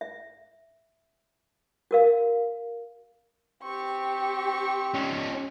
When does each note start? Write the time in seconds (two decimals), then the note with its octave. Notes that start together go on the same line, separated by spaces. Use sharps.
0.01 E5
1.91 F#4 A#4 F5
3.63 C4 G4 C#6
4.94 C#4 D#4